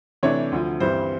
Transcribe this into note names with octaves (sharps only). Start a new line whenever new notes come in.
C3 E3 A3 D4 C#5
D2 D3 F3
G2 E3 G3 C4 C5